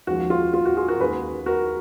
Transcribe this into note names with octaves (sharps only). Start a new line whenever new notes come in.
D#2 C#3 F3 G#3 F#4
F4
F4
F#4
F4 G#4
F#4 A#4
D#2 C#3 G#3 G#4 B4
F#4 A#4